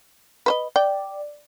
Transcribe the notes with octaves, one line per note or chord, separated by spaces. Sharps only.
B4 C5 D#5
D5 G5